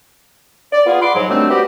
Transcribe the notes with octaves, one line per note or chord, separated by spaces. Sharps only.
D5
B3 F4 G#4
D5 F#5 B5 C6 D6
G#2 F#3
D#3 F#3 G3 A3 C4 D4
G3 B3 C4 F#4 G4